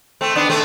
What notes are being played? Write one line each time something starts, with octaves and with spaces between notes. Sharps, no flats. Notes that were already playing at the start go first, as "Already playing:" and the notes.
A3 C4
B3 D4
A3 C4